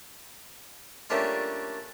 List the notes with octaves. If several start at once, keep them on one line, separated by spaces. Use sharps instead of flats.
G3 A3 A#3 C#4 D4 F4